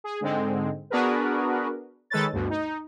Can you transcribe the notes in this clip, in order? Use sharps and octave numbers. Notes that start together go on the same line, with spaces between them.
G#4
G#2 D3 G#3 C4
B3 D4 F#4 G#4 A#4 B4
D#3 G#3 A4 B4 C#5 A6
D2 G2 B2
D#4